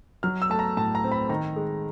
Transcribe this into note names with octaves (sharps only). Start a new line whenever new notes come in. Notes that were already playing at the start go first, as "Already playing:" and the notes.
F#3 F6
E6
A3 A5
A#5
A2 A5
A#5
C4
B5
D#3 A#5
G#3